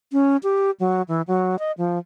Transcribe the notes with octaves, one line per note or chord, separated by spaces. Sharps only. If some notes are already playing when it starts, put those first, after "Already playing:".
C#4
G4
F#3
E3
F#3
D#5
F3